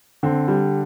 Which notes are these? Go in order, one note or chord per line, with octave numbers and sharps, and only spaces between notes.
D3 C4
G3